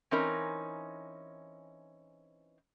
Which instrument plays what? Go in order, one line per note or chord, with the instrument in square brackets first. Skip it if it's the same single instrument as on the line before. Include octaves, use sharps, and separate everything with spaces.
[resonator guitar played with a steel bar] E3 C4 C#4 D#4 A#4